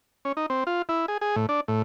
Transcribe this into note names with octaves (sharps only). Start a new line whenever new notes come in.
C#4
D#4
C4
F4
E4
G#4
G#4
A2
D4
A2